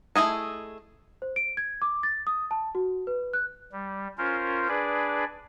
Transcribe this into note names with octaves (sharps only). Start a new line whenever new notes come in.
A3 E4 G#4 D#5
C5
D7
G#6
D6
A6
D#6
A5
F#4
B4
F#6
G3
C#4 F4 A#4 C5
D4 G#4 B4 D5